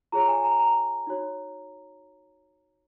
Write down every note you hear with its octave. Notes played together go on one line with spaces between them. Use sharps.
F4 G#4 C#5 A#5
G#5
A#5
A#5
D#4 F#4 C#5